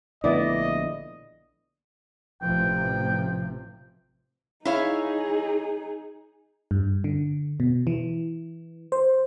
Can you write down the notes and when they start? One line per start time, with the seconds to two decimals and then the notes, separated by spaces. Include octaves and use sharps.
0.24 A#1 D3 A3 B3 E4 D5 D#5
2.42 A1 C3 F3 G5
4.65 D#4 E4 G#4 C#5 F5
6.71 G2
7.04 D3
7.60 B2
7.87 E3
8.92 C5